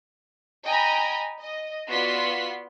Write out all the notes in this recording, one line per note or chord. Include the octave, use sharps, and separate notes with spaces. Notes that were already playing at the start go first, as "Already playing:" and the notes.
D#5 G5 G#5 A#5 B5
D#5
B3 F4 F#4 D5 C6 B6